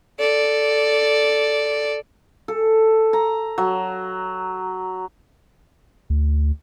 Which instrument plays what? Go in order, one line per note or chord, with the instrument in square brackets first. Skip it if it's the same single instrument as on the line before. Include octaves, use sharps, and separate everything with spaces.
[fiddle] A4 D5
[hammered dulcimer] A4
A#5
F#3
[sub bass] D2